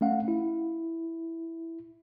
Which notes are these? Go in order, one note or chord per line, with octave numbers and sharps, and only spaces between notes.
A3 C#4 F5 F#5
E4